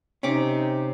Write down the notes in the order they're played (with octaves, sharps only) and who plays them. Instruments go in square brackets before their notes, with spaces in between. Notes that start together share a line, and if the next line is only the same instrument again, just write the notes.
[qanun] C3 G4 D6 [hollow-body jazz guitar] C#4 [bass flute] D#4